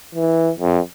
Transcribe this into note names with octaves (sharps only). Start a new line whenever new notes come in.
E3
F2